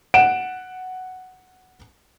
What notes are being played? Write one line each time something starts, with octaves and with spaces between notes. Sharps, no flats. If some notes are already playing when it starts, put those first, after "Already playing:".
F#5 D7 E7